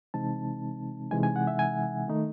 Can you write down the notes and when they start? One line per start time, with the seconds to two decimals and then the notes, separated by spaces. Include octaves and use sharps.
0.14 C3 E3 G#3 C4 D#4 A5
1.11 C3 E3 G#3 D#4 G#5
1.23 G#5
1.36 F#5
1.47 E5
1.59 G#5
2.08 D#3 A3 D#4